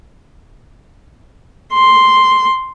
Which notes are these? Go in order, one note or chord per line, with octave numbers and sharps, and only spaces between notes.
C6